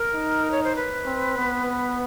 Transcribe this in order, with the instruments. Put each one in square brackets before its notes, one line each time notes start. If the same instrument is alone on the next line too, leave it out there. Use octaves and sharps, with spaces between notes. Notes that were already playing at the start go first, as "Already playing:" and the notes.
Already playing: [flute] A#4
[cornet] D#4
[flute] C#5
C5
B4
[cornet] C4
B3